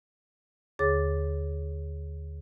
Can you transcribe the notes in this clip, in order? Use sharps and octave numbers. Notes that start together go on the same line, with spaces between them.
D#2 D3 G#4 C#5 D6 A6